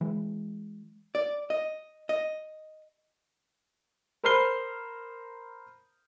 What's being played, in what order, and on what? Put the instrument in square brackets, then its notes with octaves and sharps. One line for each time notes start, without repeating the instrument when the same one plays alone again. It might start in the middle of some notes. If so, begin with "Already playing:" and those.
[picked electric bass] E3 G#3
[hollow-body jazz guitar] D5
D#5
D#5
[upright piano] A#4 C5 B5 F6 C7 G7